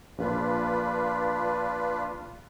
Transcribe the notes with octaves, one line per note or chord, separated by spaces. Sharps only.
A#1 D4 F4 B4